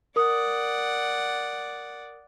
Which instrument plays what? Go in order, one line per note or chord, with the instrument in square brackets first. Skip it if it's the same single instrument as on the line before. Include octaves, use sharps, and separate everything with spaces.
[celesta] A#4 D#6 [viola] D5 F#5